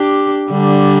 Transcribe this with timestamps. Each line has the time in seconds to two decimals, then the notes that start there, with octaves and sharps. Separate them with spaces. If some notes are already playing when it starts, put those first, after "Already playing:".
Already playing: D4 G4
0.50 D3 G3